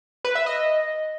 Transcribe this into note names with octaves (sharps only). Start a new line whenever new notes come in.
B4
E5
D#5